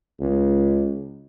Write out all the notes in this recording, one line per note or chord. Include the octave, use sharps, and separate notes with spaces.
C#2